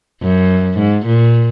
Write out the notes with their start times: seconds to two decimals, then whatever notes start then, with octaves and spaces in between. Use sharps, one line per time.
0.22 F#2
0.78 G#2
1.07 A#2